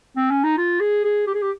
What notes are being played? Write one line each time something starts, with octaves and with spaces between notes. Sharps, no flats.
C4
C#4
D#4
F4
G#4
G#4
G4
G#4
G4